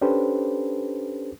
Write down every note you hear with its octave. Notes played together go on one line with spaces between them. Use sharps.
C#4 D4 G4 A4 B4 C5